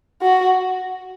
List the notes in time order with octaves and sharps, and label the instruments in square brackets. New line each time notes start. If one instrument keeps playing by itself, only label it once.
[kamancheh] F#4